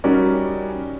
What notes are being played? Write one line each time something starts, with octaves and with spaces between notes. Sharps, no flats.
G3 C#4 D#4 F#4 A#4 D5